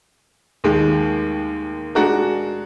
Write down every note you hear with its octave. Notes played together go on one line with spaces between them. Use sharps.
D#2 D#3 G#3
G#3 D4 F#4 A#4